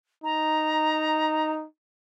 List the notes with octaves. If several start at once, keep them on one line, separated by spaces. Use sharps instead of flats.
D#4 A#5